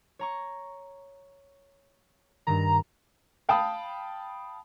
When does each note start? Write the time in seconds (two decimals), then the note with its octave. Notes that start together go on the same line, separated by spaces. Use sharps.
0.19 C#5 A#5 C#6
2.47 G2 D#3 A#5
3.49 F5 G5 A5 B5 D#6